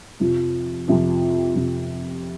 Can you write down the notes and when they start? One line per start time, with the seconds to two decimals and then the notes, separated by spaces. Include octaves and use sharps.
0.20 F2 C3 F3
0.88 F2 C3 F3
1.55 F2 C3 F3